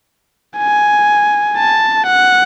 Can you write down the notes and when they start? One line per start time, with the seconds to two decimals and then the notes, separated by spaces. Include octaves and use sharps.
0.58 G#5
1.57 A5
2.07 F#5